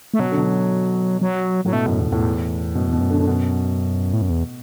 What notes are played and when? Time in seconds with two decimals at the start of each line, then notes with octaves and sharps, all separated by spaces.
0.14 A3
0.19 B2 F#3
0.32 D3
0.37 B2
1.21 F#3
1.65 A2 F#3
1.73 B2 A3
1.86 F#2 A2
1.99 E2 B2
2.12 E2 A2
2.75 F#2 B2
2.88 E2 B2
3.00 F#2
3.10 D3
3.21 D3
3.27 B2
4.13 A2
4.22 F#2
4.30 E2